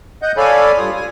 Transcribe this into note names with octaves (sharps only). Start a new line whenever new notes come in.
D#5 F#5 G6
A4 C#5 D5 F5 G#5 B5
G2 F4 D#6
G#5